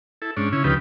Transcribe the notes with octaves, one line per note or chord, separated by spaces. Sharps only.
E4 A4
G#2 C#4 D4
C#3 C#4 E4
D2 C#3 F3 D#4 G4 B4